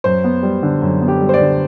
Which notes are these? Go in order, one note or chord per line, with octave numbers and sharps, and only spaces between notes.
F#2 C5
B3
G3
D3
F#2
B3
G4
G3
C5
D5
D3